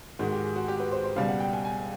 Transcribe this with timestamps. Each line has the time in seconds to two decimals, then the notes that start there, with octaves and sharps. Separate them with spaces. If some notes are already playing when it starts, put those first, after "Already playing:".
0.19 G#2 D#3 G#3 F#4
0.31 G4
0.44 G#4
0.56 F#4
0.68 G4
0.80 B4
0.92 C5
1.04 C5
1.16 C#2 B2 G3 F5
1.29 F#5
1.40 G5
1.53 G#5
1.65 G#5